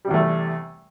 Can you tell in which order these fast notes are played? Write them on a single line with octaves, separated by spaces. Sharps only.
G3 C3 E2 A3